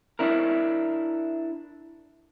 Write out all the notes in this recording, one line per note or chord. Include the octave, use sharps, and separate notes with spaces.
D4 E4 A#4